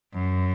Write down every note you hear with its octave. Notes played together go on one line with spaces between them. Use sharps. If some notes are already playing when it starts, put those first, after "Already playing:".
F#2